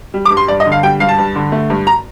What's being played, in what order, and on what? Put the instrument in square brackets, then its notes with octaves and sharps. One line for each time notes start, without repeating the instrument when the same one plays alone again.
[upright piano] G3
D6
G2
C6
G2 D5
D#5
D3
F5
G3 G5
G2 F5
A5
G2
D3
A3
G2
A#5